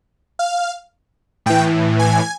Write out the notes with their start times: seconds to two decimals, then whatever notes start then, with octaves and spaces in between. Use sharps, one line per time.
0.39 F5
1.46 A2 E3 G5
1.99 G#5